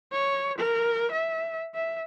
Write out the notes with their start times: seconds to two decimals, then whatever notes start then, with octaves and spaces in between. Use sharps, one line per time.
0.13 C#5
0.58 A#4
1.12 E5
1.75 E5